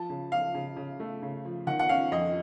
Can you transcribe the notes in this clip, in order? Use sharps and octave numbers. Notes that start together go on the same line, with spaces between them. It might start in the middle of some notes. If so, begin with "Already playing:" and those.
Already playing: F3 A5
C#3
F3 F5
C#3
C#3
A3
C#3
F3
D#3 F#5
F#5
C#4 F5
F2 D#5